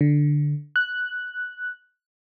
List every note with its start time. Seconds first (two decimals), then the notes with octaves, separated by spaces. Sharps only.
0.01 D3
0.76 F#6